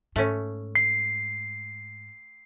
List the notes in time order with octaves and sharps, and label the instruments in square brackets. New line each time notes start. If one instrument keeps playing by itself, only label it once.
[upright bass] G#2 [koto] A3 C#4
[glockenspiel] C7